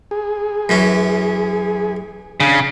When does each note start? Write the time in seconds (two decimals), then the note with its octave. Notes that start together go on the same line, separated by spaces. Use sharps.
0.11 G#4
0.69 F#2 E3 C#4
2.40 C#3 D4